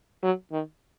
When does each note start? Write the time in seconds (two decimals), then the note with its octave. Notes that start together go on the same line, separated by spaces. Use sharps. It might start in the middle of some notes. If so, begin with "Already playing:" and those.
0.23 F#3
0.51 D#3